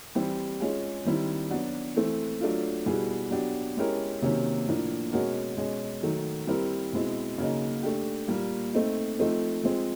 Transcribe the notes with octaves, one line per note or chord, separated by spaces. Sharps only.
E3 G3 C4 E4 G4
G#3 C#4 F4 G#4
D#3 G3 C4 E4
F#3 B3 D4 F#4
E3 A3 C4
F#3 A3 D4 F4
B2 G3 B3 E4 G#4
F#3 B3 D4 G4
G#3 C#4 E4 G4 A#4
C3 D#3 F#3 A#3 C#4
A2 F3 A#3 D4
B2 G#3 C#4 F#4 A#4
B2 G#3 C#4
D#3 F#3 A3
G3 C4 E4 G4 A#4
B2 G#3 C4 E4
C#3 F#3 A#3 D#4
A3 D4 G4
A#2 G3 A#3
A3 C4 D#4
F3 A3 C4 D#4
F3 G#3 C4